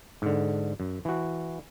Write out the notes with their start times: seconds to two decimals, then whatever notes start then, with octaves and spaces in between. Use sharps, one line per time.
0.22 G#2 D3
0.80 F#2
1.05 E3 F#4